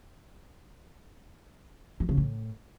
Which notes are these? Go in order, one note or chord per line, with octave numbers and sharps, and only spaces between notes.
E3
C#3
A2